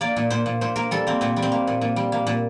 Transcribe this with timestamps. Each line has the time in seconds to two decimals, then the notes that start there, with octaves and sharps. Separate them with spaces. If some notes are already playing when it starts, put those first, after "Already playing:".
0.01 A#3 D5
0.17 A#2
0.30 A#2 C5
0.46 A#2
0.61 A#2 C5
0.76 A#3 A#4
0.91 G3 A4
1.07 A#3 C4
1.21 A#2 C4
1.36 G3
1.42 C4
1.52 A#3
1.67 A#2
1.81 A#2
1.96 G3
2.12 A#3
2.27 A#2